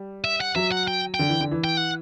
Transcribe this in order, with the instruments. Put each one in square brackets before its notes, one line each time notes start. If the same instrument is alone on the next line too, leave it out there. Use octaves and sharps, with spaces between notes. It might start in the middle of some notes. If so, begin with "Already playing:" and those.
Already playing: [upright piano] G3
[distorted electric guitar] E5
F#5
[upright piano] F#3 [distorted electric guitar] E5
[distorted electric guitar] F#5
G5
[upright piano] D3 [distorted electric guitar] G5
[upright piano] E3
D3
E3
[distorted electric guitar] G5
F#5